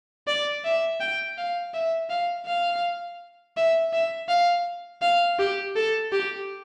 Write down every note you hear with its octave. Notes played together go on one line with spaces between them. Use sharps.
D5
E5
G5
F5
E5
F5
F5
E5
E5
F5
F5
G4
A4
G4